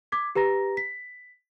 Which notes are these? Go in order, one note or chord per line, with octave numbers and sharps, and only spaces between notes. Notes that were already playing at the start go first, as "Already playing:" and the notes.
D6 G#6 B6
G4 B4 A#5 A#6
B6